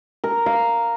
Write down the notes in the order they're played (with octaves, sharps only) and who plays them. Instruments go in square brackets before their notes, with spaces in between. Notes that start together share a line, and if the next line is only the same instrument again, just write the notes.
[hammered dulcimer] A#4
F5